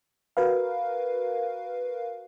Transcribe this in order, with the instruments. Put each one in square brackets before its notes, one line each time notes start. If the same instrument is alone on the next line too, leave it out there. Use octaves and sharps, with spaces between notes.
[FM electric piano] F#4 A#4 B4 F5